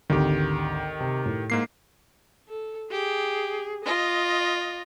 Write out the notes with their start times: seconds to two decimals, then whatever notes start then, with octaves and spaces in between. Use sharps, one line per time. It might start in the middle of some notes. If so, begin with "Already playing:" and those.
0.10 G#1 D2 D#3 G4
1.00 C3
1.26 A2
1.50 G#2 A#3 C7
2.48 A4
2.91 G4 G#4
3.85 F4 D#5